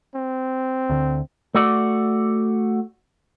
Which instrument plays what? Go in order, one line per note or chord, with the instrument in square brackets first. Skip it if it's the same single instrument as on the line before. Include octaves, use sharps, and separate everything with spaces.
[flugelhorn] C4
[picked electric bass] D2 D3
[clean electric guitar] A3 F#4 D5